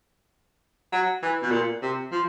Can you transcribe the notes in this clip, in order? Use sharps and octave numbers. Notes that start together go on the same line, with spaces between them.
F#3
E3
B2
A#2
C3
F3